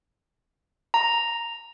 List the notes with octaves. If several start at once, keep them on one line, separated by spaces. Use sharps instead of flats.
A#5